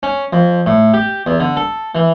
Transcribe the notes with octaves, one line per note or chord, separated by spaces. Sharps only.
C#4
F2
A2
G4
E2
D3
A4
E3